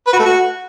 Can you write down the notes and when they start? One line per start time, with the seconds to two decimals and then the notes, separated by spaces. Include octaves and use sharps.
0.07 B4
0.13 F#4
0.19 A3
0.25 F#4